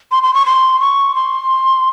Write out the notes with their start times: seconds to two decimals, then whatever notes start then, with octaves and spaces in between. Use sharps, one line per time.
0.11 C6
0.23 C6
0.34 C#6
0.46 C6
0.80 C#6
1.15 C6